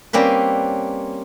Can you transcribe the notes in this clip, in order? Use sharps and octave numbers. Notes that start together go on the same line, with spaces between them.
G3 A#3 C4 C#4 B4